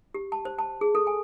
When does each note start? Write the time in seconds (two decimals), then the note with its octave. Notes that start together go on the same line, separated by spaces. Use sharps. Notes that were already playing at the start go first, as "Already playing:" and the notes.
0.14 G4
0.32 A5
0.45 C5
0.59 A5
0.81 G#4
0.95 A4
1.07 G#5